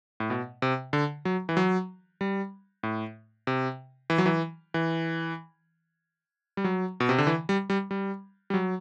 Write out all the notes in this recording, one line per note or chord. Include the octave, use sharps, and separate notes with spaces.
A2
B2
C3
D3
F#3
E3
F#3
G3
A2
C3
E3
F#3
E3
E3
G3
F#3
B2
C3
D3
E3
G3
G3
G3
G3
F#3